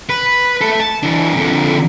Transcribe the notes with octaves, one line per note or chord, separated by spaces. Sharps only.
B4
A4 E5
A5
E3 D4
F2 D3